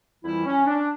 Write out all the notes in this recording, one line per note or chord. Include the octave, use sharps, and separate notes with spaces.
F2 E3 G3 E4
C#4
D4